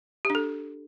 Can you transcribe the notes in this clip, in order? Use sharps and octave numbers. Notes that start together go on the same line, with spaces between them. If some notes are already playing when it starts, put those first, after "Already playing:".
G4
D4
A4